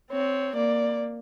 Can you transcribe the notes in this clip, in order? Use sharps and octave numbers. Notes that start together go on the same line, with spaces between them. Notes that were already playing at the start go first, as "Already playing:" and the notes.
C4 C#5
A#3 D5